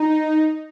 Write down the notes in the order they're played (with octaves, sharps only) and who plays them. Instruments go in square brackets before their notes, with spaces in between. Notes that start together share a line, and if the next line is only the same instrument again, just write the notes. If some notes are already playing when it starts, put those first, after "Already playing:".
Already playing: [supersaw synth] D#4